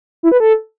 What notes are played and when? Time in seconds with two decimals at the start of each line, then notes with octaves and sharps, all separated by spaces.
0.23 E4
0.32 B4
0.40 A4